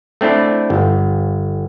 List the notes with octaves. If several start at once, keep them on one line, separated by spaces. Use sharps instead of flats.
A3 C4 D4 E4
G1